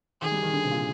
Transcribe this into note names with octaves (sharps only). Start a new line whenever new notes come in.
D#3 G#4
G3
D#3
D3
C3
A#2